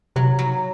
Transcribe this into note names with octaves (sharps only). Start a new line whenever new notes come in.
C3 F#3
F#3